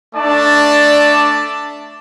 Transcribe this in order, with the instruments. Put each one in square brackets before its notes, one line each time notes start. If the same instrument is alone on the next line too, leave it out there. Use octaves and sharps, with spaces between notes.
[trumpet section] A3 D4 D5 A5